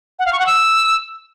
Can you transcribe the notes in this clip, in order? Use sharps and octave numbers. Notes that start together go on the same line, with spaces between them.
F#5
F5
C#6
F#5
E6